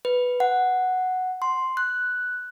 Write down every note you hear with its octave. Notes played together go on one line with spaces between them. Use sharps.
B4
F#5
C6
F#6